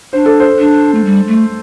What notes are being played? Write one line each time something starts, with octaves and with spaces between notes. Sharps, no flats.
D4 C5
A4
C5
D4
A3
G3
A3